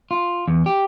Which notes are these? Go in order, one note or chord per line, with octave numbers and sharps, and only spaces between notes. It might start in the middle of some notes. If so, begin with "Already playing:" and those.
F4
E2
G4